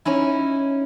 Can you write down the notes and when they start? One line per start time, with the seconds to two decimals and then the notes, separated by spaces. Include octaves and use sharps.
0.05 C#4 D#4 E4